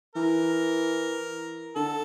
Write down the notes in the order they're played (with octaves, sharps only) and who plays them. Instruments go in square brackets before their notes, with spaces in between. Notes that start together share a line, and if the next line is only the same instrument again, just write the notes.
[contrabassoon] E3 [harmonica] A#4
[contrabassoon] D3 [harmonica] A4